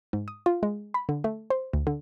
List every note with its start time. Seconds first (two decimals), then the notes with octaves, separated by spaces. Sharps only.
0.13 G#2
0.28 D#6
0.46 F4
0.63 G#3
0.94 B5
1.09 D3
1.24 A3
1.50 C5
1.73 D2
1.87 D3